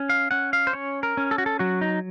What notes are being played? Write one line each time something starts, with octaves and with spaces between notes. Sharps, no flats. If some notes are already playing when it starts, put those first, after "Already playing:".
Already playing: C#4
F5
C#4 F#5
F5
C5
C#4 C#5
A#4
C#4
A4
F#4
A4
F#3 F#4
D#4